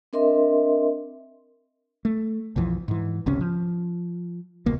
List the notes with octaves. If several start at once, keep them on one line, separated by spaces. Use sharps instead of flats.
C4 D4 A#4 D#5 E5 C6
A3
B1 F2 E3 F3
G#2 E3
G#1 C#2 C3 C#4
F3
E1 C#2 B2 A#3